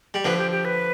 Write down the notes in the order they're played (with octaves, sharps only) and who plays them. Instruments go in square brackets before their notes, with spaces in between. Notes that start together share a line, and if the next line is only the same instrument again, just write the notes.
[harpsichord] G3
[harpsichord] D3 F3 [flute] B4
[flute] G4
G4
B4